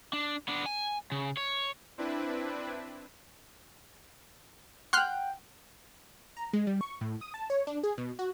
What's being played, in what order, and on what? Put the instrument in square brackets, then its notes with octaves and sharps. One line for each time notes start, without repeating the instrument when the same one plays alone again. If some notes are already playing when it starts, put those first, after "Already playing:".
[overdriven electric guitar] D4
B3 D4
G#5
C#3
C#5
[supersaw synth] C4 D4 E4 B4
[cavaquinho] F#5 G5 [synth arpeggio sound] C6 F6 F#6
[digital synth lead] A#5
G#3
G3
C#6
A2
D#6
A5
C#5
D4
G#4
B2
F#4